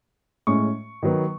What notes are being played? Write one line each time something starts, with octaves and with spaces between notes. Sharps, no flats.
A2 G#3 C#4 C#6
D#3 F#3 B3